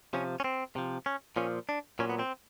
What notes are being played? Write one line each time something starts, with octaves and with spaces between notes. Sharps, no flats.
C3 F3 C#4
C#4
C4
C3 F3
C#4
A#2 F3 C#4
D4
A#2 F#3 C#4
B3
C4